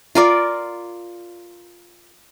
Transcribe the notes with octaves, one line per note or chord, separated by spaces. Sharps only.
F4 A#4 D5